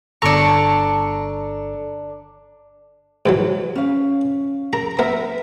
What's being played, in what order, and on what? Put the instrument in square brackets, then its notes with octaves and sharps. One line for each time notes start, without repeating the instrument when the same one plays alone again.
[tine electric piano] G1 A4 A#5 [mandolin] D4 C#6
[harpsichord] G#2 E3 F#3
[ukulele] C#4 F5
[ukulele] A#4 [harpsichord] A#5
[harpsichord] B3 A#4 [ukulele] E5